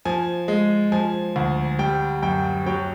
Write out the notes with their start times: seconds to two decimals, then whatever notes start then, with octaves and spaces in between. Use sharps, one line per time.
0.05 F3 G#5
0.48 G#3
0.92 F3 G#5
1.36 D2
1.79 G3 G5
2.22 F#2 G5
2.66 F#3 G5